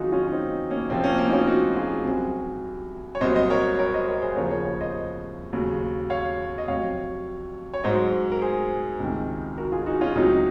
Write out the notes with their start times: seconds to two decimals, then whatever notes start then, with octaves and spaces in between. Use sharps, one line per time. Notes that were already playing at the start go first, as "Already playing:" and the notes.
Already playing: F2 D#3 F#3 D#4 F4 F#4 G#4
0.12 C#4 F4
0.27 C#4
0.32 C4 D#4
0.70 A#3 C#4
0.89 F2 C3 F3 C4
1.04 A#3 C#4
1.18 A#3 C#4
1.29 D#4
1.32 C#4 F4
1.47 D#4 F#4
1.76 F4 G#4
2.05 C2 C3 F#3 G#4 C5
3.15 C#5
3.21 C2 A#2 F#3 C5 D#5
3.35 C5 D#5
3.50 A#4 C#5
3.79 A#4 C#5
3.93 C5 D#5
4.08 A#4 C#5
4.22 G#4 C5
4.36 D#2 C#3 F3 A#4 C#5
4.51 A#4 C#5
4.65 A#4 C#5
4.80 C5 D#5
5.53 D#2 C#3 F#3
6.10 C#5 F5
6.58 D#5
6.68 F2 C3 F#3 C#5 F5
7.74 C#5
7.84 G#2 F#3 C5 D#5
8.32 A#4
8.42 G#4 C5
9.00 C#2 C3 D#3
9.58 F#4 A#4
9.72 F4 G#4
9.82 G#4
9.86 D#4 F#4
10.01 C#4 F4
10.15 C#2 C3 F#3 D#4 F#4